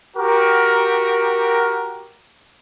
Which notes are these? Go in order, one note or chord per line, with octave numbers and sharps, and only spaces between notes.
F#4 G4 A#4